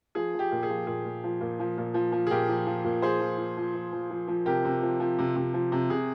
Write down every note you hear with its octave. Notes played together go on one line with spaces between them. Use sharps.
F3 G#4
F3
G4
A#2
G#4
F3
A#2 G#4
A#2
F3
A#2
F3
A#2
F3
F3
G#4
A#2 G4 A#4
F3
F3
A#2
F3 G#4 C5
F3
F3
F3
F3
F3
F3
F3
C3 G4 A#4
C3
F3
F3
C3
C3
F3
C3
C3 G#4